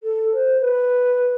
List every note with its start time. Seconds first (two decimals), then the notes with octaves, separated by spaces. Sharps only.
0.03 A4
0.33 C5
0.61 B4